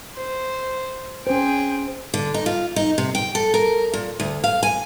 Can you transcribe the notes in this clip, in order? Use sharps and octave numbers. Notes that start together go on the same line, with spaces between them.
C5
C#4 G#4 C5 G5
D3
D#4
F4
D#4
C3
G5
A4
A#4
A#2
D2
F5
G#5